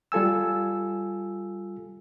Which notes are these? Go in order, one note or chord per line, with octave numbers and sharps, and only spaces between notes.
G3 F4 A4 G#5 E6